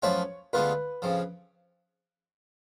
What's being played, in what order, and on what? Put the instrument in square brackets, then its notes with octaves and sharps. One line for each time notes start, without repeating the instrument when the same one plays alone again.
[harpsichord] F#2 F3 A3 F4 B4 [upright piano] C#5
[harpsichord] D2 D3 G#3 B3 F4 [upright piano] B4
[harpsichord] F2 C#3 F3